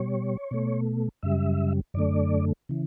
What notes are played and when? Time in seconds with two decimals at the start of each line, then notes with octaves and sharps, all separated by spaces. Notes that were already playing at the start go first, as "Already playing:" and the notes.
Already playing: B2 G3 C#5
0.51 B2 A3
1.22 F#2 C#3 G3 E5
1.94 F#2 D3 A3 D5
2.69 C#3 E3